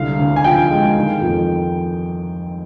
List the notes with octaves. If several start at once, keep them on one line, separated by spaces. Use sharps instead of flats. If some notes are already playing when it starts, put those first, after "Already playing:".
Already playing: C2 D3 G3 F5
D2
G#5
F3 G5
G#3
D#3
F2